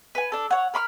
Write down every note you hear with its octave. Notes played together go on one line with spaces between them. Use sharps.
B4 G#5
D4 A4
C#5 F#5
A#4 B5 C#6 F6